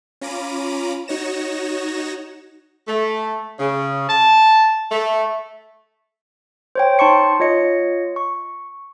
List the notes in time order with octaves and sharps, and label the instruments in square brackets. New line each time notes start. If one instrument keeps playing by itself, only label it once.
[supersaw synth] C#4 F4 A#5 B5 D6 D#7
D#4 F#4 C#5 A#6 E7
[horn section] A3
C#3
A5
A3
[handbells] C5 C#5 G5
D#4 A5 C6 C#6 C#7
F4 C#5 D#5 C#7
C#6